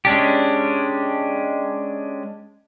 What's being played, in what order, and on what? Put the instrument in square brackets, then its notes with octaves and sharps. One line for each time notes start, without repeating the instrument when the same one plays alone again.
[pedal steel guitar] G#3 C#4 D4 G4